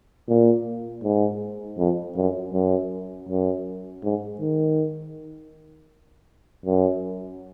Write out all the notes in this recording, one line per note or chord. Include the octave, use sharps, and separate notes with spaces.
A#2
G#2
F2
F#2
F#2
F#2
G#2
D#3
F#2